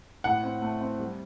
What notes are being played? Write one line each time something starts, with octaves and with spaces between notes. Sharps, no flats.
A2 F#5
C4
A3
C4
G3